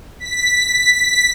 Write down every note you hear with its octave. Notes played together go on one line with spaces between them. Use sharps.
B6